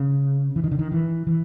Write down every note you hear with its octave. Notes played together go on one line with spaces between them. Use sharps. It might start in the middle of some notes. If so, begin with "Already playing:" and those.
Already playing: C#3
E3
D#3
D3
D#3
E3
E3